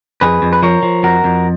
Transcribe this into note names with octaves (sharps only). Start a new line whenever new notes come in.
F2 G#4 B4
F2
B4
F3 A#4 C#5
F3
F2 F#4 A#4
F2